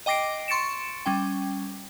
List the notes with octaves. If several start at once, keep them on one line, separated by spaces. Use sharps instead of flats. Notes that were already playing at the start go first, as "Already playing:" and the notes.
D#5 G5 D6 A#6 C7 D7
C6 C#6 A6 C#7 D7 E7
G3 C#4 G5